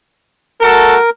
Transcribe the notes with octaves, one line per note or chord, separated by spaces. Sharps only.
A3 F#4 A4 A#4